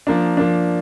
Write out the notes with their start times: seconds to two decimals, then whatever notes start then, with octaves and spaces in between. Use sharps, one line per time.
0.07 F3 A#3 D4
0.37 F3 A#3 D4